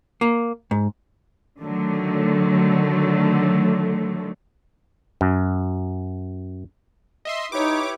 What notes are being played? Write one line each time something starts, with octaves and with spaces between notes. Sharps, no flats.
A#3
G#2
D3 D#3 F#3 A3
F#2
D#5 E5 C6
D#4 E4 G4 B4 C#5 D6